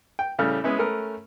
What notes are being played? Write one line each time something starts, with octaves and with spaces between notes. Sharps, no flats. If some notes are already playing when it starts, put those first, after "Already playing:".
G5
A2 C#3 G3 A3 F6
G#3 B3 C#4 E4
A3 C#4 A#4 B4